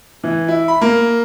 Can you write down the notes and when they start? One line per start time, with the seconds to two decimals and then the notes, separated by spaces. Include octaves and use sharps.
0.24 E3
0.48 E4
0.68 B5
0.81 A#3